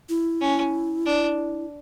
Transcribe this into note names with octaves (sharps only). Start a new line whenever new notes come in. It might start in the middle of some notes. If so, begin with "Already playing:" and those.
E4
C#4
D4